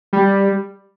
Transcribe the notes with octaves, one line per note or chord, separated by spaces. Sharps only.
G3